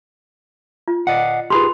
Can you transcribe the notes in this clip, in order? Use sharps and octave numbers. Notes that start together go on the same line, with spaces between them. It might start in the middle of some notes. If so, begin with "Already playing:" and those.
F4
D5 D#5 F#5
F4 G4 G#4 B4 B5 C6